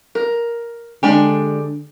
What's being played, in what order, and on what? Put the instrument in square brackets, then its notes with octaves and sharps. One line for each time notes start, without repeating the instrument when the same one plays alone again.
[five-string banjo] A#4
[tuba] D3 [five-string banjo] G#3 D4 G4